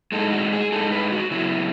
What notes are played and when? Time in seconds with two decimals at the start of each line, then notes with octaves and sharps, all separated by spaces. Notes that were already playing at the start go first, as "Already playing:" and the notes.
0.12 A2 G#3 D#4 A4
0.33 F#4
0.53 G#4
0.72 A2 G#3 D#4 A4
0.92 B4
1.12 F#4
1.31 C#3 F#3 B3 E4